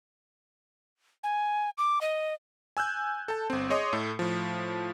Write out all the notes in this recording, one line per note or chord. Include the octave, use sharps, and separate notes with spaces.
G#5
D6
D#5
G#5 E6 F#6 G6
A4 A5
G1 C4
G#4 C#5 D#5 C6 D6 D#6
A2 A3 A4
A2 F3